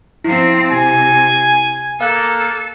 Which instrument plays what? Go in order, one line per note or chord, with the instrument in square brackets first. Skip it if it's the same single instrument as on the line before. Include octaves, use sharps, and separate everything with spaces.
[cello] F3 C4 [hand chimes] E4
[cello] C3 [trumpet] G#5
[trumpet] A#3 [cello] A4 [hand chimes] F5 F#6